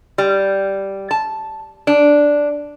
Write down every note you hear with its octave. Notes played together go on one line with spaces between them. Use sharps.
G3
A5
D4